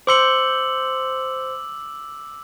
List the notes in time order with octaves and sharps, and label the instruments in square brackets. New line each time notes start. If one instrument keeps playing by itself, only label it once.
[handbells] C5 C6 C#7 [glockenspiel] D6 E6 F#7